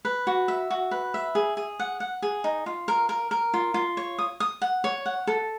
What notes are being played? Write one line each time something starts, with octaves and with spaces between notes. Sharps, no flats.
B4
F#4
E5
F#4
B4
E5
G#4
G#4
F#5
F#5
G#4
D#4
F4
A#4
A#4
A#4
F4
F4
C#5
D#6
D#6
F#5
C#5
F#5
A4